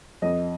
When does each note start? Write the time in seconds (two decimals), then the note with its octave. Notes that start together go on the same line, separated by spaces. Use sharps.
0.22 F2 D#5